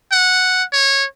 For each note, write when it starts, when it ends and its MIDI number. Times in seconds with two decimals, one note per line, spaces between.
0.12 0.64 78
0.73 1.05 73